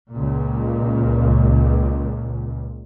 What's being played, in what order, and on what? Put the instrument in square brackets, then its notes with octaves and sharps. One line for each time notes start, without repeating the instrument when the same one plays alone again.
[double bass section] C#2 A#2